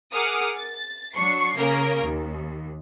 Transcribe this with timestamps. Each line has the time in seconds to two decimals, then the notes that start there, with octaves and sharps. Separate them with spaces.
0.13 G#4 A#4 F#5 D6 D#6 F6
0.57 A6
1.13 F#3 D4 C#6 C7
1.56 C#3 A#3 C#4 A#4
2.03 D#2